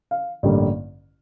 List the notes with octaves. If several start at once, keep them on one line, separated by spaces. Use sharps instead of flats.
F5
A1 G2 D3 G3 A#3